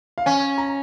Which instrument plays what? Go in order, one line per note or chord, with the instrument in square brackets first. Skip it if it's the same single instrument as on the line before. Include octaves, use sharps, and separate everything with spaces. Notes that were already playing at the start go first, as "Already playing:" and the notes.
[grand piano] F5
[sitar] C#4 [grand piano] G#5
[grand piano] A#5